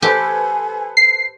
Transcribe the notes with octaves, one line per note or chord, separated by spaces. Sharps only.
G4 A4 B4 C5 G#5
C7